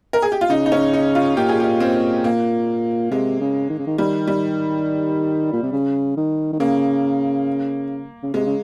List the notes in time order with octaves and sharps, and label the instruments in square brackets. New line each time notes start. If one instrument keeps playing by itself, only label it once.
[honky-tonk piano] A#4
G#4
G4
F4
[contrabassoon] C#3 [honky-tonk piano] D#4
[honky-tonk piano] D#4
C#4
D#4
F4
[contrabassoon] A#2 [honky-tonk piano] G4
[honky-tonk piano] G#4
G4
C4
A#3
[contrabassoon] C3 [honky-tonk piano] G#3
[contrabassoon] C#3
D#3
C#3
D#3
[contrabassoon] D#3 [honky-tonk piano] G3
[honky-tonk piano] G3
[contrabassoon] A#2
C3
C#3
D#3
D#3
[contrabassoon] C#3 [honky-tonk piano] A#3
[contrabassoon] C#3
[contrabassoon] C3 [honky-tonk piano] G#3
[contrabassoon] C#3